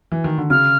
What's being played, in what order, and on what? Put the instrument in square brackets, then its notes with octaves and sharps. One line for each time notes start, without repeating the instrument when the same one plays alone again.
[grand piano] E3
D#3
D3
[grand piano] C#3 [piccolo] F6